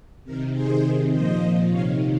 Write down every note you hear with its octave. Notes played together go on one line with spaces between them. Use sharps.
C3 D#3 A#4
C3 D#3 G#4 C5
C3 D#3
A#2 F3 C5 D#5
A#2 F3
C3 D#3 C#5 F5